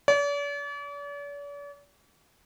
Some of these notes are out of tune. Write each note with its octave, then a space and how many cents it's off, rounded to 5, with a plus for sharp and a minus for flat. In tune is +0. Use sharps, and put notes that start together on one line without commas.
D5 -45